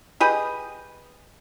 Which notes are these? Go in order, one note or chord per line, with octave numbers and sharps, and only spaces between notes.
G4 G#4 B4 D#5